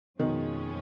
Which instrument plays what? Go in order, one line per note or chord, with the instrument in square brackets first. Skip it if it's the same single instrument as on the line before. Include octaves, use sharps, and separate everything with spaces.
[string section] F2 F3 G#3 C#4 [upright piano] B2 D#3